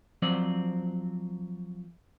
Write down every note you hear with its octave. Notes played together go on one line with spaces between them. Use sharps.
F3 F#3 C4 C5 D5